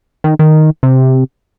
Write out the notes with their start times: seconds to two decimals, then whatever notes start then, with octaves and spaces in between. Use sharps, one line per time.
0.24 D#3
0.39 D#3
0.83 C3